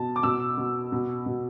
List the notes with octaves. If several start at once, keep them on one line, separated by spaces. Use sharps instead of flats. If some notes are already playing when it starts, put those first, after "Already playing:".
Already playing: B2 A5
D6
B2 E6
B2
B2
B2